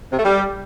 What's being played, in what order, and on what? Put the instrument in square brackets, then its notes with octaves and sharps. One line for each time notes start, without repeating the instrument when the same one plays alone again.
[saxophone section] C3
A3
G3